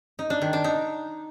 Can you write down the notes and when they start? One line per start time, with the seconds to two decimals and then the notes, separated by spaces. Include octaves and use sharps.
0.19 D#4
0.30 D4
0.42 D#3
0.53 D4
0.64 D#4